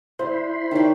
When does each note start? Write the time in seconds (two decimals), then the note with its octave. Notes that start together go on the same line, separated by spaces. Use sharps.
0.19 D3 E4 C5 B5 C6
0.71 D#3 G3 D4 C#5 G5